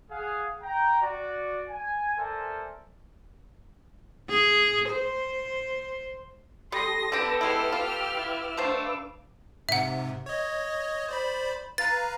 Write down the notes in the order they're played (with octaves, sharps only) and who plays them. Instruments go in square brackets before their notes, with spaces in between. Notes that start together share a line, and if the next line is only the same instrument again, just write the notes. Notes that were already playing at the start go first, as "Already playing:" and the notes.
[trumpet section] G#4 F5 F#5
G5 A#5
F#4 D5
G#5
A4 A#4 C5 D5 E5 G#5
[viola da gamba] G#4
C5
[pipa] G3 [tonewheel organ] G4 A4 D#6 [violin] C6 [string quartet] A#6
[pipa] D3 G4 [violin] B3 A4 [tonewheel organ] B4 D6 E6
[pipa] G#3 E4 [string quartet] G4 F6
[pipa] F4
[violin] E4
[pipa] B2 A3 C5 [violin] D4 F5
[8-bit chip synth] G#2 C3 [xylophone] E5 F#5
[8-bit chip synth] C#5 D#5
C5 D5 B5
[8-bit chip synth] B4 F5 A#5 [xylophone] A6